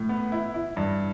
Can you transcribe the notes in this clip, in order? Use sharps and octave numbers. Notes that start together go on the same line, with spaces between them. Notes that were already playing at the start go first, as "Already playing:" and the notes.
Already playing: A2
B3
E4
E4
G2